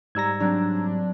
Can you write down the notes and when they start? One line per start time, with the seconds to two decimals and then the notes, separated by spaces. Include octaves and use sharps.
0.15 G#2 G3 A#5 E6 G#6 A#6
0.40 F#3 C4 D4